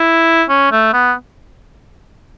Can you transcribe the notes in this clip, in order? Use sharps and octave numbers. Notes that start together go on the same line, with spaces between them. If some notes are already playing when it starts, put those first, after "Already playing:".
Already playing: E4
C#4
A3
B3